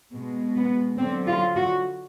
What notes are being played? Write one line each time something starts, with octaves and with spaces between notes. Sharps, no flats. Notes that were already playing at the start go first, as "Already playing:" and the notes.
B2 G#3
B3
D3 F#3 C4
F4
F#4